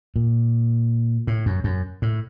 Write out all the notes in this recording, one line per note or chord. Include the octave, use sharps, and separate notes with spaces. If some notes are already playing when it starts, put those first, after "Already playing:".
A#2
A2
F#2
F#2
A2